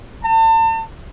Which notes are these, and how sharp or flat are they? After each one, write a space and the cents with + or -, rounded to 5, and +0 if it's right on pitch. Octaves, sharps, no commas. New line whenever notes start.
A5 +40